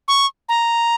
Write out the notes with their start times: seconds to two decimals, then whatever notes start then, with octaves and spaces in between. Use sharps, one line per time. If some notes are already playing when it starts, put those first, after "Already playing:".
0.08 C#6
0.49 A#5